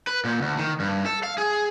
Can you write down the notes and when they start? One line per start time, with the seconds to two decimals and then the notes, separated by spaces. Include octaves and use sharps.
0.07 B4
0.25 A#2
0.41 D2
0.58 D#3
0.80 G2
1.06 A4
1.23 F5
1.38 G#4